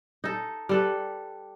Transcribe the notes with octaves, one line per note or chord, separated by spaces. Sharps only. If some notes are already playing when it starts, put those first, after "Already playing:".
D#4 A4
G3 A4 B4